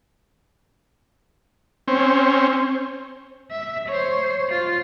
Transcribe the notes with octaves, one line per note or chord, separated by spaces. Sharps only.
C4 C#4
E5
C5 C#5
F4